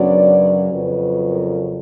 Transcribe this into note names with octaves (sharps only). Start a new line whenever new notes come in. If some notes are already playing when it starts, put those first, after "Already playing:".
Already playing: F#2 C#3 F#3 B3 D4 D5
F2 C#3 F#3 B4
A#4